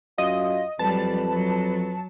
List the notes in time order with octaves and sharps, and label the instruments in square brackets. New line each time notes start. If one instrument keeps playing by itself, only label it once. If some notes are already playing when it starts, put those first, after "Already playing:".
[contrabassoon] F#2 [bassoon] F4 [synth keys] D#5
[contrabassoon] F2 [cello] F#3 G3 [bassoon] B4 [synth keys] A5
[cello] F#3